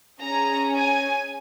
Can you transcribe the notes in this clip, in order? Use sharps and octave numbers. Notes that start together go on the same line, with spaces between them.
C#4 G#4 A#5
G#5